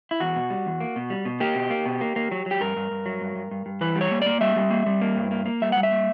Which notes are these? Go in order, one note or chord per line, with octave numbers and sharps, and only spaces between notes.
E4
E2 F#4
B2
G3
E2
A#3
B2
G3
B2
A#3 G4
B2
A#3
B2
A#3
A#3
F#3
F#3 G4
G2 A#4
G2
G2
F#3
G2
G2
G2
G2
E3 B4
G3
C#5
A#3
A#3 D5
G3 E5
G3
A#3
G3
A#3
G2
A#3
A#3
G3 E5
G3 F#5
E5
A#3